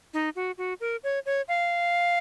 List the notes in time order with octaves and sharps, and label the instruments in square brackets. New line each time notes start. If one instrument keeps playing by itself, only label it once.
[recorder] D#4
F#4
F#4
A#4
C#5
C#5
F5